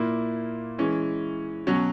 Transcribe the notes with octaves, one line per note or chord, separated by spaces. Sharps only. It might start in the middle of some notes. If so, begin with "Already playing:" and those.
Already playing: A#2 A#3 E4
E3 G#3 C#4
B2 F#3 C#4 F#4